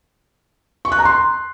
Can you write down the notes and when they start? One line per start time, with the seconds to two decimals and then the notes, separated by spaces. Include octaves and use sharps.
0.85 C#6
0.92 F#6
0.99 A#5
1.05 C6